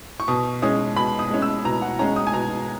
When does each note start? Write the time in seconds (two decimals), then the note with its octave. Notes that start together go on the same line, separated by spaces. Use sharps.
0.20 C#6
0.28 B2 D#6
0.62 G#3 C#4 D#6
0.96 B2 B5
1.19 D#6
1.31 G#3 C#4
1.42 E6
1.65 B2 A#5
1.82 F#5
1.99 G#3 C#4 A#5
2.16 D#6
2.27 G#5
2.34 B2 A#5